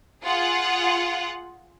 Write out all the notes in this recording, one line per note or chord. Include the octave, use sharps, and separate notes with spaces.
F4 G#4 F#5